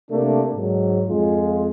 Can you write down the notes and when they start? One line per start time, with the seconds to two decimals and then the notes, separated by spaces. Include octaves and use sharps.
0.11 C3 A3 A#3 D4
0.55 G#2 F#3
1.08 F2 G#3 F4